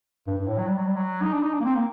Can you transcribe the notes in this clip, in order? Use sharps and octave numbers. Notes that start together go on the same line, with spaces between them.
G2
G2
A2
F#3
G3
F#3
G3
F#3
D#4
D4
D#4
D4
A#3
C4
A#3